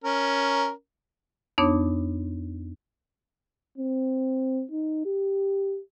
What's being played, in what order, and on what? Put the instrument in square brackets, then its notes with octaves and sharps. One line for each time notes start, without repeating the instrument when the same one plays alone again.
[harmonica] C#4 A#4
[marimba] F2 B3 D4 D#4 C#5 D6
[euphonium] C4
D#4
G4